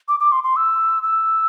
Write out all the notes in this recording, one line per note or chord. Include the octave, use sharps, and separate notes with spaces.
D6
D6
C6
C6
E6
E6